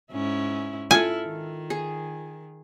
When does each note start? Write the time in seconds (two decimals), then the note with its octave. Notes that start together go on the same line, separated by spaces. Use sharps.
0.12 G#2 C#4 E4
0.91 E4 F4 A4 G#5
1.27 D#3
1.70 G#4